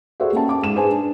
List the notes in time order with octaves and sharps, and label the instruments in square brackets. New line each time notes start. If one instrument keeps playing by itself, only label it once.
[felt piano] F#4 G#4 A4 C5 D5 E5
A#3 C#4 G5 A5
D6
G#2 E7
G#4 B4 C5 G#5 A5
D4